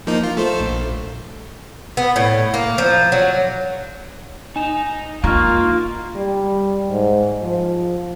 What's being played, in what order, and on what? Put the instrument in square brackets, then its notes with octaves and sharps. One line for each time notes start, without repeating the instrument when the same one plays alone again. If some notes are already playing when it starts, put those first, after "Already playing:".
[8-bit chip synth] F3 A#3 D#4
F4
A3 A4 C5
A#1
[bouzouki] B3
A2
A#3
F3
F#3
[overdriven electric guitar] D#4 [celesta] G#5 E7
[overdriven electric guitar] A#3 [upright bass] D#4 [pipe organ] F4 [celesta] A#5 C#6 F6
[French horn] G3
G#2
F3